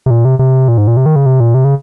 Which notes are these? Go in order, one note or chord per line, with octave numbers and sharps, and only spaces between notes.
C3
A#2
C3
C3
A#2
G#2
A#2
C3
D#3
C#3
C3
A#2
C3
C#3